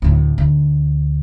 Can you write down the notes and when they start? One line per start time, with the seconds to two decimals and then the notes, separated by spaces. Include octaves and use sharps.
0.02 D2 A2
0.38 D2